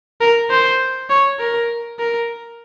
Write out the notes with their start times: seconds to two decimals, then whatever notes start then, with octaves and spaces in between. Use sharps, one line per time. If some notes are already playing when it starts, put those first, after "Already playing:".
0.21 A#4
0.50 C5
1.10 C#5
1.40 A#4
1.99 A#4